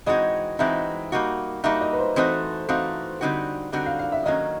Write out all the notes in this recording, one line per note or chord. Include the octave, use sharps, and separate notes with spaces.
E3 G#3 C4 D#4 F#4 D#5
E3 G#3 C4 D#4 F#4 E5
G3 A#3 D#4 F#4
G3 A#3 D#4 F#4 E5
D#5
B4
C5
E3 A3 C4 D#4 F#4 C5
E3 A3 C4 D#4 F#4 F5
D3 G3 C4 D#4 F#4
D3 G3 C4 D#4 F#4
F5
F5
E5
D#3 F#3 A#3 C#4 D#5